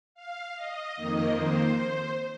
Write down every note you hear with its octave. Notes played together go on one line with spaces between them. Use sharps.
F5
D#5
F2 D#3 A#3 D#5
C5